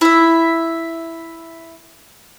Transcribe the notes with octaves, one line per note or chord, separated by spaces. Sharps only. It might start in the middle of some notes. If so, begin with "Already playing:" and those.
E4 E5